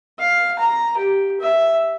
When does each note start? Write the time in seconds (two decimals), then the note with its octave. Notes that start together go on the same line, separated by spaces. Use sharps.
0.19 F5
0.59 A#5
0.97 G4
1.40 E5